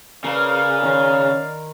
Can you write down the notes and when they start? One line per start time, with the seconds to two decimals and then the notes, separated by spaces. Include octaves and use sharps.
0.24 C#3 A#4 B4 D5 F5
0.83 D#3 C#4 C6